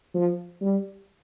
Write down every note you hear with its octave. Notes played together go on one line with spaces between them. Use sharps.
F3
G3